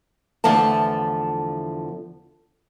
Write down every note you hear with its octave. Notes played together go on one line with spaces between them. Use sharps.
E2 D3 F3 A3 A5